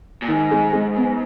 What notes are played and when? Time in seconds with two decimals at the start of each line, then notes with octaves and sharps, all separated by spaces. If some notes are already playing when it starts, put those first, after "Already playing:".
0.22 A#2
0.28 G#2 D#3
0.51 G#3
0.73 G#3
0.96 B3